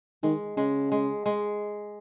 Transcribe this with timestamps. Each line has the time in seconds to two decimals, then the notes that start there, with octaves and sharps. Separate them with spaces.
0.23 D#3 G#3
0.57 C#3 G#3
0.92 G#3
1.26 G#3